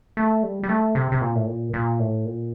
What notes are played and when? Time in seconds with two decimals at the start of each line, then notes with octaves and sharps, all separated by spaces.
0.17 A3
0.43 G3
0.63 G3
0.69 A3
0.95 C3
1.12 C3
1.21 A#2
1.35 A2
1.46 A#2
1.74 A#2
1.99 A2
2.25 A#2